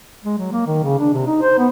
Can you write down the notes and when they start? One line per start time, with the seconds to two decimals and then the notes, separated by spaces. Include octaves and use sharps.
0.24 G#3
0.38 F#3
0.52 A#3
0.67 D#3
0.83 C#3
0.99 D4
1.13 C3
1.26 D#4
1.42 C5
1.58 B3